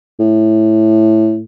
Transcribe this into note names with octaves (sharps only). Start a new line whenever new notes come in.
A2